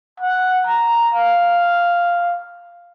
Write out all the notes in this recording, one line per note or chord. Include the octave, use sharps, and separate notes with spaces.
F#5
A#5
F5